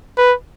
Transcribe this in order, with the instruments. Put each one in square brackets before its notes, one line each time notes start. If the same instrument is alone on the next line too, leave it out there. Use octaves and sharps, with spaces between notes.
[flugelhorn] B4